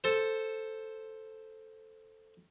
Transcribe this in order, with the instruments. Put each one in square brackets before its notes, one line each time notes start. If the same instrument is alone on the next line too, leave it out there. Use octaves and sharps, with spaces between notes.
[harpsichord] A4 C5